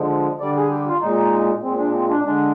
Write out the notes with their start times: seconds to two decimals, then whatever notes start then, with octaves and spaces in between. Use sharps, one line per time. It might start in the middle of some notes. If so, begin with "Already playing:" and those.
Already playing: D3 F3 G#3
0.40 D3 G3 D5
0.56 G#4
0.70 G4
0.87 F4
1.01 A#2 G#3 D#4
1.63 A#2 G#3 C4
1.79 D4
1.94 C4
2.09 D4
2.25 D3 G#3 D4